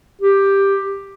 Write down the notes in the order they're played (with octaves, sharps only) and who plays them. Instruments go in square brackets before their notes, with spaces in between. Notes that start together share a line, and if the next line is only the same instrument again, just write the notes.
[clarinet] G4